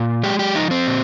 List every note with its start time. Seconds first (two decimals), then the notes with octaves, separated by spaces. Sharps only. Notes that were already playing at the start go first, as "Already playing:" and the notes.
Already playing: A#2
0.23 G#3 G4
0.39 G4
0.55 F3 D#4
0.71 C4
0.87 A#2